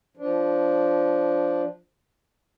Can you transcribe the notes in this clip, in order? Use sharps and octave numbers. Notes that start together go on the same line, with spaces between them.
F3 D4